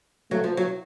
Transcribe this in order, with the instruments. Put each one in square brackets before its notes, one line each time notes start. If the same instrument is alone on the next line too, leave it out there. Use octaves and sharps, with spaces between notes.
[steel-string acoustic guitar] F#3 [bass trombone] A3
[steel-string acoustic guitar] F3
F#3